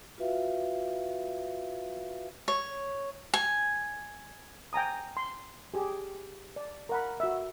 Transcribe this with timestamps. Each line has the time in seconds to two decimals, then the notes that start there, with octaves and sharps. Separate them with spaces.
0.18 F4 F#4 B4 E5 F5
2.48 C#5
3.34 G#5
4.73 G5 G#5 A#5 D#6
5.17 C6
5.74 G4 G#4
6.56 D5
6.89 A#4 F#5 B5
7.20 F#4 E5